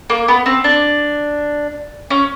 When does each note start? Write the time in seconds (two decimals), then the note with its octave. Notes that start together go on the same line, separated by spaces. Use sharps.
0.10 A#3
0.28 B3
0.46 C4
0.64 D4
2.10 C#4